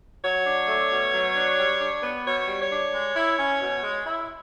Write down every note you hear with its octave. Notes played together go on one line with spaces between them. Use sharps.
F#3 C#5
D4
A3
B2
F#3
D4
G3
D4
B3
B2 C#5
G3
C#5
D4
G#3
E4
C#4
B2
G#3
E4